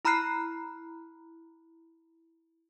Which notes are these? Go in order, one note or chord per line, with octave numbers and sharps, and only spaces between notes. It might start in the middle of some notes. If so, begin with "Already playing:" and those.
E4 A#5 B5 F6 F#6 C7